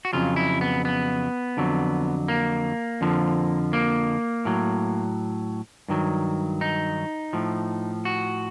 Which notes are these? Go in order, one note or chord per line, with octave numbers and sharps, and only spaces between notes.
F#4
F2 C#3 F#3 F4
E4
B3
B3
F2 D3 F#3
A#3
F2 D3 F3
A#3
A2 F#3
G2 D#3 F#3
D#4
A2 F3
F#4